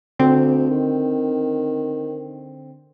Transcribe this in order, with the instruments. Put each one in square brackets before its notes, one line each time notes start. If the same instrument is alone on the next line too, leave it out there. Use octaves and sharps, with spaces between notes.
[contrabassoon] D2 [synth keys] D3 C4
[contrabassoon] D#3